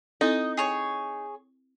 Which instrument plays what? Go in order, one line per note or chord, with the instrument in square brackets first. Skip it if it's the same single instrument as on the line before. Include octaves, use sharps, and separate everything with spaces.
[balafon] C4 E4 A4 [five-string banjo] D#4 [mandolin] D#5
[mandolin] G#4 C#5